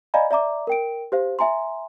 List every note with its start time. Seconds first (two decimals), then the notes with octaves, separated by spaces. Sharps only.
0.14 D5 D#5 F5 G#5 A#5 B5
0.31 D5 E5 A#5 D6
0.67 A#4 G5 D7
1.12 G4 C5 F5
1.39 E5 G#5 A#5 C6